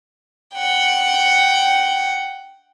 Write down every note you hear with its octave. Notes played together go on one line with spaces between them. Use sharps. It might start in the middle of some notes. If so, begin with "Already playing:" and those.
F#5 G5